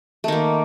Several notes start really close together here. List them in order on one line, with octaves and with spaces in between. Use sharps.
A3 D#3 A#3